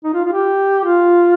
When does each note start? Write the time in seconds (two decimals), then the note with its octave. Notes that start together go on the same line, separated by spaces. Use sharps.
0.04 D#4
0.14 F4
0.24 F4
0.32 G4
0.85 F4